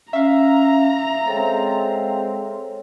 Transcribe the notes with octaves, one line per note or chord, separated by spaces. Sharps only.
C#4 E5 F5 A#5
G#3 C4 A4 C#5